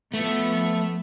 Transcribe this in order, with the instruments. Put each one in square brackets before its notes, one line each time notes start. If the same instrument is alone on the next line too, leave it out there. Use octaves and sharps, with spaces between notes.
[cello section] F3 B3 [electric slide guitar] A3